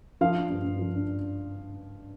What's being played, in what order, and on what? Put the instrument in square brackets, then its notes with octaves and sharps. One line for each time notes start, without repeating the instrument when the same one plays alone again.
[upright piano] F3 F5
D4
G2
G2
F3
D4